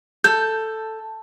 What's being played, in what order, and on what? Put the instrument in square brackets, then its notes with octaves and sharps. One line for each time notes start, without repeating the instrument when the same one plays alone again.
[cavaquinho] A4 [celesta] G6